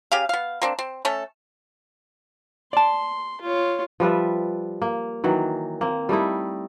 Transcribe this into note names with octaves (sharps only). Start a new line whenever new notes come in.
C#3 G4 G#4 F5
B3 F5
A#3 C4 D4
C4
A3 C#4 A4
D5 A5 C6
F4 C#5
F3 G3 B4 E5
A#3
D#3 E3 F#3
A#3 C4
G3 A3 D#4 E4